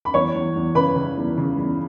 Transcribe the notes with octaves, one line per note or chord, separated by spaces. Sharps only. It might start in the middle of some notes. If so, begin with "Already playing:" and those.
B5
E2 C#5 C#6
E2
E2
C#3 B4 B5
C#3
E2
C#3
E2